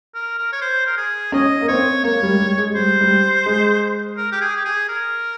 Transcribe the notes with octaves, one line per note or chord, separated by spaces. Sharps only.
A#4
A#4
C#5
C5
A#4
G#4
C#4 D#5
A#3
C4 C#5
A#3 C#5
G3
G3
G#3
G3 C5
G3
G#3
A#4
G4
G#4
G4
G#4
A#4